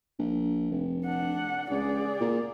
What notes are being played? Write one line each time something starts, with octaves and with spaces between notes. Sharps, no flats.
A#1
F1
D4 F#5
C#2 G#4 D5
A#2